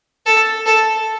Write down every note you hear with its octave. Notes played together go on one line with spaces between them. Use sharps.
A4
A4